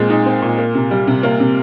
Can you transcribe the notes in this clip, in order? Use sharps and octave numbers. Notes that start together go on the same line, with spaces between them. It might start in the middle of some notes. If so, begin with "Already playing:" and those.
Already playing: A#2 G#3 C4
D#4
C4
A#2
A#3
C3
G3
C3
A#3
C3